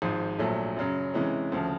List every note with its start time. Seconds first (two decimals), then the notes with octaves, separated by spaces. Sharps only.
0.02 G#1 G#2 F3
0.39 A#1 A#2 F#3 A3
0.76 F#2 C#3 F#3
1.14 C3 E3 G#3 C#4
1.52 D2 C#3 F3